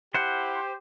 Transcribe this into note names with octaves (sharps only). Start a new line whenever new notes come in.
E4 G4 C5 F#5